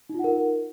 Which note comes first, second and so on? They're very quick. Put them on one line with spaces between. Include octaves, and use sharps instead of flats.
D#4 F4 F#5 A#4